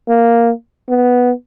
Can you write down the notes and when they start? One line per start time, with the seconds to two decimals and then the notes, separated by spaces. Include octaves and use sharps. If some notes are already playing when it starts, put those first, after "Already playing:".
0.08 A#3
0.89 B3